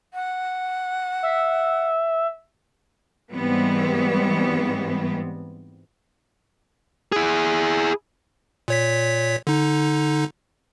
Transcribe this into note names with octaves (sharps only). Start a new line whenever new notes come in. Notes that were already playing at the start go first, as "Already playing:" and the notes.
F#5
E5
G#2 E3 G3 B3 C4
E4 G#4
A#2 C#5 B6
D3 D#4